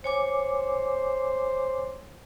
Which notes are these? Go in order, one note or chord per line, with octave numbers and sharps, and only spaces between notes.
C5 C#5 G#5 D6